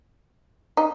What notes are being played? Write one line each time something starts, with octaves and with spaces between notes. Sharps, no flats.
D#4